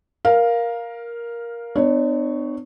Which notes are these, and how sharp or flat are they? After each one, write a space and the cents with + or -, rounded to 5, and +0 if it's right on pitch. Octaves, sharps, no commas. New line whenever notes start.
A#4 +10 F5 +0
B3 +45 D4 +45 C#5 +5